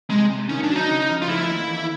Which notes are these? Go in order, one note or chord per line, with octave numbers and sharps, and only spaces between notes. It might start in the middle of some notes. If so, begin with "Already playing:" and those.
C3 G#3
C3
D#3 C#4
D4
F#3
D#4
C#3
F3
F4
A3 E4
D#2
E3